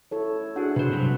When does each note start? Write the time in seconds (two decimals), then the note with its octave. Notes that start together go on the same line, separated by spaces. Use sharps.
0.11 E4 A4 C#5
0.56 D4 F#4 G#4 F#5
0.76 C3 B4 C5
0.91 G2 C3 F#3 C4